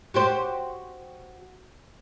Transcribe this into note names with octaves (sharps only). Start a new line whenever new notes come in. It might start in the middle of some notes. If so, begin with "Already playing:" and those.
F#4 G4 C5